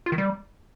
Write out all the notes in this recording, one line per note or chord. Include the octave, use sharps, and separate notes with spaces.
F4
D#3
G3